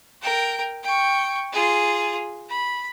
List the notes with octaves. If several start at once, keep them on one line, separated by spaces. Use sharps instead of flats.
A#4 G5
G5 C#6
F4 G#4
B5